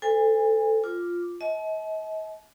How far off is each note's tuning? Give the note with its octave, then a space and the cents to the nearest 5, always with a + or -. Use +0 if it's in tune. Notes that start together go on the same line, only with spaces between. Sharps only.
A4 +5 C5 -35 G#5 -30
F4 +0 D6 +0
D#5 +40 A5 -40